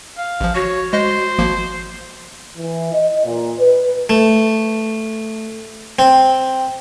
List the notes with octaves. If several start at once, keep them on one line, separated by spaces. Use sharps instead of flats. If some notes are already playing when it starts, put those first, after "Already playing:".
F5
A1 F3
F#4 C#5
G#3 C5 D#5
G#1 F3 A#3
E3
D#5
A#2
B4
A3
C4